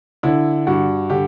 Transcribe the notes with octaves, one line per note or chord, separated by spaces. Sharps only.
D3 E4
G2 F#4
D3 G4